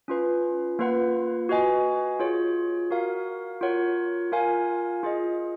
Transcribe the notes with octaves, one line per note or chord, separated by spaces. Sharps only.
C#4 F4 B4
A#3 F4 B4 F#5
F#4 B4 D#5 G#5
F4 G#4 C#5
F#4 A#4 F5
F4 A#4 C#5 F#5
F4 A#4 F5 G#5
F4 G#4 D#5